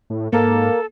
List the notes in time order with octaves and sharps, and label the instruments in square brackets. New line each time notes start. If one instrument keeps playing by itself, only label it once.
[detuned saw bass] A2
[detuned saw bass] G#2 [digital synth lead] A#3 [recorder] A4